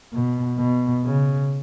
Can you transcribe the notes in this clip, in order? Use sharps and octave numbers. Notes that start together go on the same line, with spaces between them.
B2
B2
C#3